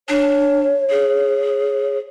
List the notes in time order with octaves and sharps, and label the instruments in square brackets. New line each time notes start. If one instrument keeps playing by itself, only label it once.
[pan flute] D4 [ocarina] C#5
[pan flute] G#4